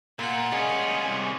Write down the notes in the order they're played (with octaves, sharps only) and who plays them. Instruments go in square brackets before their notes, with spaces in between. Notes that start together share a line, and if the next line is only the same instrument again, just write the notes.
[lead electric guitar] A#2 [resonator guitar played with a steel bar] A#3 [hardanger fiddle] F4 F#5
[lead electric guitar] G3 G#4 [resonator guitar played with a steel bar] G#3 [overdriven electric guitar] C#4
[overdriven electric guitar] C2